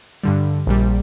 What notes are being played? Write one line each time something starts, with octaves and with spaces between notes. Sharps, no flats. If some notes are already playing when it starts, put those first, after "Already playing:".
G2 D3 G3
A#1 A#2 G3